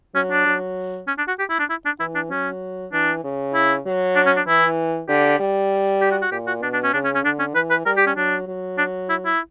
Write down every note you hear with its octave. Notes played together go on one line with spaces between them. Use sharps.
F#3 C#4
D4
F#3
C#4
D4
F#4
G4
E4
D4
E4
D4
E3 E4
D4
F#3 C#4
E3 D4
C#3
E4
F#3
D4
C#4
D4
E3 E4
D3 G4
G3
G4
F#4
F#4
A#2 G4
F#4
B2 D4
D4
C#4
C#3 D4
C#4
C#4
D3 D4
C#4
E3 B4
B4
G3 A#4
G4
C#4
F#3 D4
F#3
D4
E4
E4